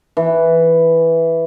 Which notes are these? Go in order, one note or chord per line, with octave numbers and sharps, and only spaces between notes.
E3